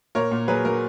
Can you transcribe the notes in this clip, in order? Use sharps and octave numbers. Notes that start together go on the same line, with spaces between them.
A#2 A#4 C#5
A#2
F#3 G#4 B4
F#3 A#4